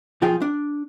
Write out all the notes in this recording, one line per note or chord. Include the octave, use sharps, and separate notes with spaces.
B1 F3 F4 G#4 G5
D4